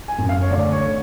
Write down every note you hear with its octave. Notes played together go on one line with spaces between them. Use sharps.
G#5
F#2
F5
C#5
D2 D5
C#5
D3